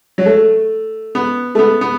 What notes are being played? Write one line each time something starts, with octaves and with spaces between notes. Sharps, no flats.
F#3
A3
B3
A3
B3
B3